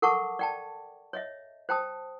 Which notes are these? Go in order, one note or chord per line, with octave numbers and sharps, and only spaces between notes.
A4 A#4 F#5 A5 C#6 D6
D5 G5 A5
C#5 D#5 E5
C5 G5 A5 D#6